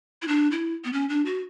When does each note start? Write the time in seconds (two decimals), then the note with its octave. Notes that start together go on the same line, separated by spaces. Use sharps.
0.22 E4
0.28 D4
0.51 E4
0.84 B3
0.93 C#4
1.09 D4
1.26 F#4